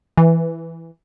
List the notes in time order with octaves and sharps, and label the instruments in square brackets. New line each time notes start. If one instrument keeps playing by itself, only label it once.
[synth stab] E3